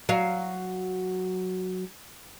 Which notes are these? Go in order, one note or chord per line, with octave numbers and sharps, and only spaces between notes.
F#3 F5